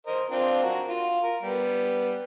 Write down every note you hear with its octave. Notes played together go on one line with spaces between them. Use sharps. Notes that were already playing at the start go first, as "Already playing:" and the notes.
A#4 C5 D#5
C4 D4 F4
F#4 A#4
F4
A#4
G3 B3